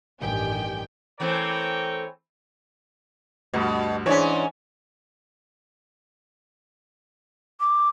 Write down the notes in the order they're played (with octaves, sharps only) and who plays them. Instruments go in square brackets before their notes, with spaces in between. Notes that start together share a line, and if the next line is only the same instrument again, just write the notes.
[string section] A1 G2 D#3 G4 G5 G#5
[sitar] E3 A3 C4 [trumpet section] A#4 C#5 G5
[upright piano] D2 G2 [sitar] B2
[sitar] G#2 C#4 [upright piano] E3 D4 C#5
[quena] D6